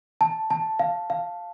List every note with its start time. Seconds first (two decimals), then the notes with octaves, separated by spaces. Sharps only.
0.21 A5
0.50 A5
0.79 F5
1.10 F5